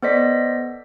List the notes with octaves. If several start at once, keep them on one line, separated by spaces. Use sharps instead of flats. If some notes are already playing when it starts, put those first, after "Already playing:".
B3 A4 C5 D5 D#5 B6